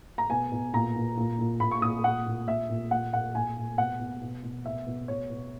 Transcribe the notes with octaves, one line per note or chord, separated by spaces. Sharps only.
A#5
B2 G#5
B2
A#2 A#5
A#2
A#2
A#2
A#2 B5
C#6
A#2 D#6
A#2 F#5
A#2
A#2 E5
A#2
A#2 F#5
A#2 F#5
A#2 G#5
A#2
B2 F#5
B2
B2
B2
B2 E5
B2
B2 C#5
B2